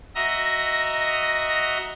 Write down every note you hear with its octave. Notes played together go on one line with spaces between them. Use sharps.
F#4 D#5 E5 A#5